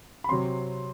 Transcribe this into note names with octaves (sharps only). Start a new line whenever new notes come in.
B5
C3 F#3 C4 C6